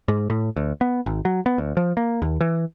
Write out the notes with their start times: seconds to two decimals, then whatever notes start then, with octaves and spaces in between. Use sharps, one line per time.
0.08 G#2
0.30 A2
0.56 D2
0.81 B3
1.06 G#1
1.25 F#3
1.46 B3
1.58 D2
1.77 F3
1.97 A#3
2.22 D#2
2.41 E3